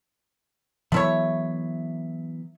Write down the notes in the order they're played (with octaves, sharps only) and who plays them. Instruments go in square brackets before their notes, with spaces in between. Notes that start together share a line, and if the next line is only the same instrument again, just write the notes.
[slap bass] E3 F#3 B3 [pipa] A3 E4 C#5